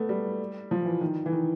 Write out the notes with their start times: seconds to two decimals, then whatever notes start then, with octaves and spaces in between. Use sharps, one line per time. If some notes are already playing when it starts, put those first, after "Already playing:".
Already playing: A3 B3
0.09 G3
0.71 F3
0.86 E3
1.01 D#3
1.26 E3
1.32 D#3